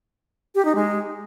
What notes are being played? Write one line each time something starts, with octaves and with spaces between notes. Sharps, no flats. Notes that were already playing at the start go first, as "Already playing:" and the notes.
G4
D#4
G#3